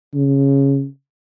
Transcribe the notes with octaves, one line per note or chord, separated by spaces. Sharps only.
C#3